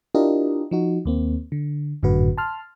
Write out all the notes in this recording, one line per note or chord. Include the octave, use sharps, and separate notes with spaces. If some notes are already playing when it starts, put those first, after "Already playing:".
D4 E4 F4 G4 A#4 D#5
F3 D#4 F#4
D#2 A#3 C4
D3
G#1 F#2 A2 D3 F#4 B4
A5 C6 F6